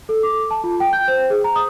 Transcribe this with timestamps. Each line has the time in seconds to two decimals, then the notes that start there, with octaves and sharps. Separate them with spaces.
0.09 A4
0.23 D6
0.51 A5
0.64 F4
0.80 G5
0.93 G6
1.08 C5
1.30 G#4
1.44 A#5
1.56 D#6